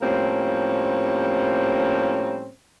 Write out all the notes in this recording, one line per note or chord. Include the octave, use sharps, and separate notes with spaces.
A2 F3 G3 A#3 C4 C#4